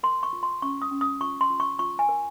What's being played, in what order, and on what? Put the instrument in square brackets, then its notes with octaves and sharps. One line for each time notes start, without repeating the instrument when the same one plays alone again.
[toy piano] A#4 C6
C#6
F4
C6
C#4 C#6
D#6
C#4
D#6
F4 C#6
C6
F4
C#6
F4 C#6
G#5
A#4